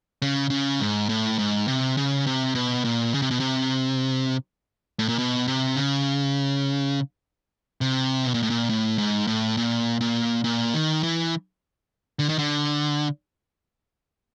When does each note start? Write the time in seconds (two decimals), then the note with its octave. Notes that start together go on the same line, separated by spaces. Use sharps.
0.22 C#3
0.50 C#3
0.80 G#2
1.09 A2
1.39 G#2
1.68 C3
1.97 C#3
2.27 C3
2.55 B2
2.85 A#2
3.14 C#3
3.22 C3
3.31 B2
3.40 C3
4.99 A2
5.09 A#2
5.18 B2
5.47 C3
5.76 C#3
7.81 C3
8.25 B2
8.34 A#2
8.43 A2
8.50 A#2
8.69 A2
8.98 G#2
9.27 A2
9.57 A#2
10.01 A#2
10.44 A#2
10.74 D#3
11.03 E3
12.19 D3
12.29 D#3
12.39 D3